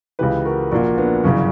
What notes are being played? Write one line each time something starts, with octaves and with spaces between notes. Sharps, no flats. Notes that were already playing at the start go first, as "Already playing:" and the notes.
C#2 C#3 E3 G4 B4
F#4 A#4
A#1 A#2 F#4 A#4
B3 D4
G1 F#2 C#3 E3 C#4